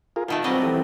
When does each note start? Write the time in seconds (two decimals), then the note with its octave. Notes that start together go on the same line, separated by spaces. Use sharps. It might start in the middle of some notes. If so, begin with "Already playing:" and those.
0.16 F4 G#4 A#4
0.28 B2 D#3 A3 F4
0.44 F#3 G3 C4 D#5
0.62 E3 G4 A4